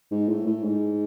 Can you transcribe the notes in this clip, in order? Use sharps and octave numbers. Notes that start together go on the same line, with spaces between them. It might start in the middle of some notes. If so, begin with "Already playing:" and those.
G#2
A2
A2
G#2